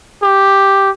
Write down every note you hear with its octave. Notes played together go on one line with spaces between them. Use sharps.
G4